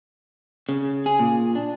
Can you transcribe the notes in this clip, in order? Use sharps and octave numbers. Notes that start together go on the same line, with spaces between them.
C#3
G#4
A#2
D4